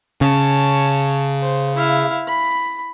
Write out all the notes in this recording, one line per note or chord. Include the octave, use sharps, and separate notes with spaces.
C#3 C#5 A5
C5
E4 F5
B5